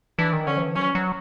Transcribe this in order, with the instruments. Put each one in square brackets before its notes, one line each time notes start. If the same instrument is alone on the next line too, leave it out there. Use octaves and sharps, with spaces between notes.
[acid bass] E3 [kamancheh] D4
[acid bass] D#3
[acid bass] D3 [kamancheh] C#4
[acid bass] F3
E3
[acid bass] F#3 [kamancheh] C#4
[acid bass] F#3